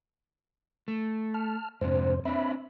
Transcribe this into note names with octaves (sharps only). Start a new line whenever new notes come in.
A3
A5 F6
F2 G#2 C3 D4 C5
C4 D4 E5 B5